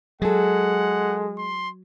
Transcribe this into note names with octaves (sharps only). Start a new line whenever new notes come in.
F#3 G#3 G#4 A4 F#5
C6